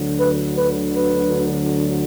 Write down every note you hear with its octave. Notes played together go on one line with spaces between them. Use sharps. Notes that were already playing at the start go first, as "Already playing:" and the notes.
Already playing: D2 D3 F#3
B4
B4
B4